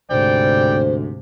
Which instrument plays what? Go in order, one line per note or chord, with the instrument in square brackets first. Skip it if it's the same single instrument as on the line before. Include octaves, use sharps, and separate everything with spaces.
[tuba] D2 [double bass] G#2 C3 [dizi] C5 [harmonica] D5 G5